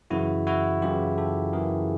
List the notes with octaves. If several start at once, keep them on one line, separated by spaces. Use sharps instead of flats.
F#2 C#3 E3 E4 F#4
E4 F#4
F#2 C#3 E3 F4 G4
G4 A4
F#2 C#3 E3 G#4 A#4